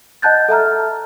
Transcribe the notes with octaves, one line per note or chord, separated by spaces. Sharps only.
D#5 F#5 A5 F#6 G6 A6
A4 E5 A#5 F6